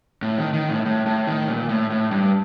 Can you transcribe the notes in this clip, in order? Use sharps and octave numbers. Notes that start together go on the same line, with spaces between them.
A2
D#3
D#3
A2
A2
A2
D#3
A#2
A2
A2
G2